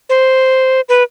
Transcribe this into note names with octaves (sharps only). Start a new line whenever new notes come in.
C5
B4